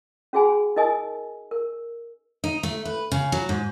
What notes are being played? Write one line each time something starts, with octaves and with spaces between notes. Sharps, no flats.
C#4 F#4 G#4 F#5 G#5 B5
D#4 A#4 D#5 G#5 D#6
A#4
D#4
A3
B4
C#3
F#3
G#2